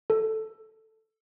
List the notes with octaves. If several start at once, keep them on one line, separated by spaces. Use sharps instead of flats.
A4